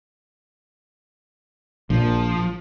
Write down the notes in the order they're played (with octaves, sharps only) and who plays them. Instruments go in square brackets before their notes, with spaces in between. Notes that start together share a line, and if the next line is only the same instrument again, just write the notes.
[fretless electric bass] A#1 A#2 [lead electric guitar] F3